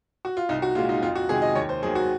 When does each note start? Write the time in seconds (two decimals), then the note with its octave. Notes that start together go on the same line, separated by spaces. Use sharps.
0.25 F#4
0.37 F4
0.49 C2 D#4
0.62 F#4
0.75 A#2 G#3 F4
0.89 D#4
1.02 F2 F4
1.15 F#4
1.29 C3 D#3 G#3 G#4
1.42 D#5
1.55 D#2 C#5
1.69 C5
1.82 D#3 F#3 A#3 G#4
1.95 F#4